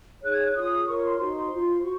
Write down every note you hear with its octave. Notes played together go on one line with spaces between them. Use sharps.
D#4 G#4 C#5 F#6
G#6
F#6
F4 G#4 C#5 D#6
F4 A#4 C#5 C#6
C6
D#4 F#4 C5 C6
F4 C5
F#4 C5 C#6